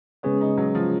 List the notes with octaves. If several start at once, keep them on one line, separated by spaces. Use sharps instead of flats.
C#3 G#3 B3 C#4 G#4 C#5
D#4
F#3
F3